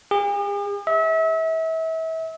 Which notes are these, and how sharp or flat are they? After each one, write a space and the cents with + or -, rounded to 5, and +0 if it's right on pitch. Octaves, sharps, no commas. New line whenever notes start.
G#4 -45
E5 -35